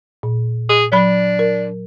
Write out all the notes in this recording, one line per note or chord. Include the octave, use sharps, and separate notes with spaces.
A#2
G#4
F#3 D4 B5
A#4